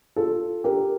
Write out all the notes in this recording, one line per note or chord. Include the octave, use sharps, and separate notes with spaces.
F4 A4
G4 A#4